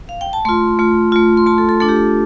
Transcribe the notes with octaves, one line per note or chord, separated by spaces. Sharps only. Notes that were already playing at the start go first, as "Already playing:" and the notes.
F5
G5
A5
A3 F4 C6
A3 F4
A3 F4
C6
A3 F4 A5
A4
A4
A3 D4 F4 A4
G4
A4